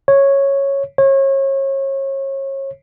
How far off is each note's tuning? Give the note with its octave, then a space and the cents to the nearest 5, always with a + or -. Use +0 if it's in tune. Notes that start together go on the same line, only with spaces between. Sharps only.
C#5 -5
C#5 -30